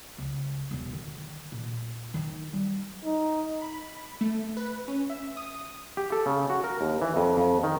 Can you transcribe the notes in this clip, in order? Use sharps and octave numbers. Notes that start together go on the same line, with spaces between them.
C#2
E1 E2
D3 D#3
A#2
D#3 D#4
G3
D#4
B5
A3
B4
C#4
E5
D#6
G4
A4
C#3
F#4
A#4
D#2
E3
F2
F2
D#3